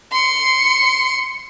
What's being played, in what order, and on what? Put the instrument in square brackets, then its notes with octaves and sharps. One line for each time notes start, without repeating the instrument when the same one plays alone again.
[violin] C6 C#7